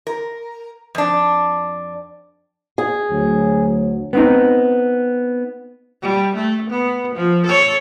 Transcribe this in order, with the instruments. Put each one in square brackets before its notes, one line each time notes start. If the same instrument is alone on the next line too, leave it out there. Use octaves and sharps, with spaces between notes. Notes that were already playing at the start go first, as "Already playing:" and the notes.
[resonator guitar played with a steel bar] A#4
F2 D4
[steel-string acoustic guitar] G#4
[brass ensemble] D2 F#3
[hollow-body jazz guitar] B3 C4 D#4
[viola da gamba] G3
A3
B3
F3
A4 C#5